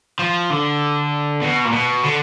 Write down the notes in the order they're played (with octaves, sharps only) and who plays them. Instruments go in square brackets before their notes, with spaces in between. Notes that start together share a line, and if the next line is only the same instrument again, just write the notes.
[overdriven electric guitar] F3
D3
B2
A#2
B2
D3